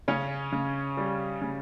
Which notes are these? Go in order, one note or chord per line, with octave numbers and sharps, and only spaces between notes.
C#3 C#4 C#5
C#3
G3
C#3